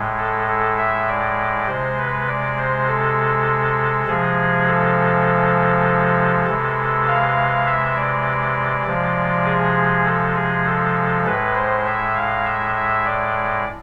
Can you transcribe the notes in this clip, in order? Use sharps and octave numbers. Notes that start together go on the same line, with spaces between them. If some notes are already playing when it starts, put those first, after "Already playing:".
Already playing: A2 G#3
A4
A4
E5
D5
C3 G#3 C5
B4
D5
C5
A4
C3 F3 G#3 G#4
A4
C3 E3 G#3
F5
E5
D5
C3 F3 G#3
G#4
A4
G#4
A4
A2 G#3 B4
C5
E5
F5
E5
E5
D5